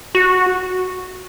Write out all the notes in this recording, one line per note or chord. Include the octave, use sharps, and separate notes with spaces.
F#4